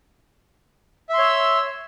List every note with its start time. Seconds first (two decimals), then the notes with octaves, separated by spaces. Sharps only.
1.09 E5
1.14 C6
1.18 C#5
1.23 E6